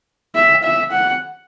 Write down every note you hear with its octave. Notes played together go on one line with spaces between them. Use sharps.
E5
E5
F#5